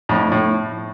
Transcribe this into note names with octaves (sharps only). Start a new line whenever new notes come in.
F2 A2
A2